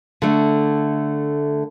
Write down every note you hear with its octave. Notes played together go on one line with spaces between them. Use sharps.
D3 A3